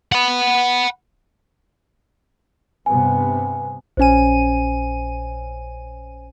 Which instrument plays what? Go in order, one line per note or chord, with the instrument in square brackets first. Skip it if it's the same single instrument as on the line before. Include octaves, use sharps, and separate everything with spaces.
[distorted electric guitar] F#5 B5
[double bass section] G2 C3 B3 [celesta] G#5
[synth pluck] A#1 C#4 D#7 [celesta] C5 G#5